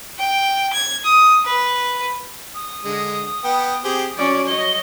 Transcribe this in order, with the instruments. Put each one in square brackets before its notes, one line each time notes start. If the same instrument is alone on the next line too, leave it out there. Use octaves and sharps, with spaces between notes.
[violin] G5
G#6
D#6
B4
[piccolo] D#6
[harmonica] D3 G#3
B3 G5
C4 G4 G#4
[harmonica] F#3 [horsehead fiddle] C#4 D5
[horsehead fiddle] C#5 D#5 [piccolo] G7